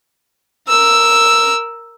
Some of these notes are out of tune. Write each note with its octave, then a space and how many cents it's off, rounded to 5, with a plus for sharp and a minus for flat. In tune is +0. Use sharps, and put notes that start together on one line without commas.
A#4 +0 E6 +0